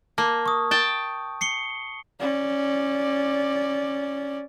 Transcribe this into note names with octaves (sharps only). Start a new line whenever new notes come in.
A#3 A5
C#6 D#6
G5 A5
C7 C#7 G7
C#4 D5